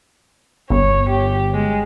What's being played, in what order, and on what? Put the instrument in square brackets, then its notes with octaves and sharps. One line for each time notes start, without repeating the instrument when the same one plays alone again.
[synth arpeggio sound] G1 [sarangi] C#5
[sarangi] G4
G#3